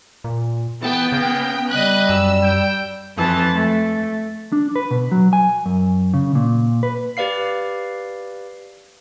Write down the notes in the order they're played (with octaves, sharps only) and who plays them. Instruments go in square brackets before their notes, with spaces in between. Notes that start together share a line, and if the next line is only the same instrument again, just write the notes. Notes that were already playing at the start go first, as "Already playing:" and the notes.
[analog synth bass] A#2
[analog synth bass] E3 [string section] B3 G5 [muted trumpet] A5
[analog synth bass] C#3 [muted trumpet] A#3
[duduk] G3 [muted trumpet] B4 [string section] D#5 F#6
[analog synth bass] F#2 [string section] E6
[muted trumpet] G5
[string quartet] F2 E3 A5
A3
[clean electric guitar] D4
B4
B2
F#3
G#5
F#2
C#3
A#2
B4
[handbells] G4 B4 D5 F5 C7